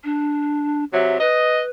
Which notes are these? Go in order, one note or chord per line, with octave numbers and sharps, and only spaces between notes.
D4
C3 F#3 E5
B4 D#5